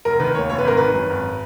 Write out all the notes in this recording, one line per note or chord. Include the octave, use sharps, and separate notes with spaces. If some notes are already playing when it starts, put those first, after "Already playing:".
F1 A#4
D#3 B4
D#2 C#5
F1 C#5
B4
G#1 A#4
D#3 B4
F#2
G#1